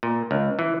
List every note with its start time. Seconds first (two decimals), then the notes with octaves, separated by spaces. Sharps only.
0.03 A#2
0.31 C#2
0.59 E3